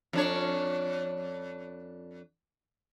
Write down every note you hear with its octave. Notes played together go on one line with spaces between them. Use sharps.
F2 D4 C#5